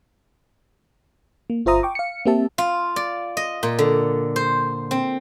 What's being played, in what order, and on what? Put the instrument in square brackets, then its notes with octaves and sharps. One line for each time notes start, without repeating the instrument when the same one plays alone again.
[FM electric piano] A#3
G1 F4 C5 E5 A#5 D#6
G5 C#6 D6
F5 C#7
A#3 C4 G4 E5 A5
[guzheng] F4
D5
D#5
A#2
D3
C5
C4